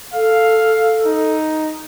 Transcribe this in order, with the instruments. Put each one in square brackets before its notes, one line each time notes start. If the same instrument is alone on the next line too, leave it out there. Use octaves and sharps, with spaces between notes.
[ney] A4 [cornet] F5
[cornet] D#4